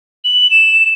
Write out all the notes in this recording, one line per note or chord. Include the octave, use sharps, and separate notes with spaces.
F#7
E7